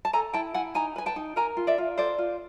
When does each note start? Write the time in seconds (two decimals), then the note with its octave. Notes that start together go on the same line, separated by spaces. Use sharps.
0.05 A5
0.13 A4 G#5 A#5
0.33 E4 G5 A5
0.54 E4 F#5 G#5
0.75 D#4 G#5 A#5
0.96 B4 G#5
1.06 G5 A5
1.16 D#4
1.36 A#4 G#5 A#5
1.57 F4
1.67 D5 E5
1.78 F4
1.98 A4 C5 D5
2.18 F4